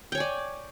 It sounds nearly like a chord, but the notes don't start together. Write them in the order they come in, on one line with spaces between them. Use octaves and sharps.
G5 C#5 G#5 D5